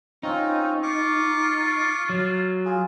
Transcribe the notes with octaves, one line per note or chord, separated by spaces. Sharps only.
C4 C#4 D#4 F4
F4 C#6 D6
F#3
F4 G#4